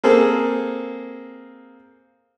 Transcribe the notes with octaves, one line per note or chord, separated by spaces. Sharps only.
A#3 C4 G#4 A4